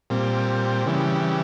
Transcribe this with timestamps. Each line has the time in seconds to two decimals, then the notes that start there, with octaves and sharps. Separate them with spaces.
0.10 A#2 G3 C4
0.86 C#3 E3 G3